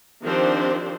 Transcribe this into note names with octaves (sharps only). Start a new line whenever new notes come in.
D#3 F3 C4 D4 G4 C5